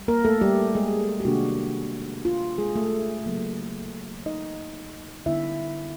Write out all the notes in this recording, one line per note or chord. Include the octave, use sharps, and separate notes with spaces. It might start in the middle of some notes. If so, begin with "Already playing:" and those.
Already playing: G3
A#3 A#4
A3 A4
G3 G4
G#3 G#4
G4
C3 D#3 G3 A#3 D4 F#4
F4
G#3 G#4
A3 A4
C#3 F#3 A#3
D#4 D#5
D3 G3 B3 D#4 E4 E5